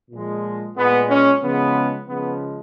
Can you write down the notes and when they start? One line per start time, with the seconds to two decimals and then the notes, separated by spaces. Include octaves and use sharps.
0.11 A#2 F3 G#3
0.76 A#2 G#3 B3
1.09 C#4
1.42 C#3 F3 G#3 B3
2.07 C#3 F3 G#3 B3